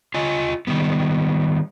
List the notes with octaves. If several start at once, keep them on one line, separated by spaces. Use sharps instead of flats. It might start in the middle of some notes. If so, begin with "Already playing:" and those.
F4 D#5 G#5
D#3 G3 B3